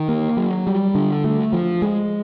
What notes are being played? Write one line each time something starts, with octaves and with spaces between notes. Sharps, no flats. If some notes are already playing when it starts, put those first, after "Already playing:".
Already playing: D#3
A#3
F#3
G3
D3
A3
F3
G#3